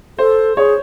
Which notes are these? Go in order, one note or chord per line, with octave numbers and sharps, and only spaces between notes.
A4 C5
G#4 C#5